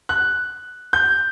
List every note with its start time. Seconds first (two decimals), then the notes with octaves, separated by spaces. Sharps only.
0.09 F#6
0.93 G6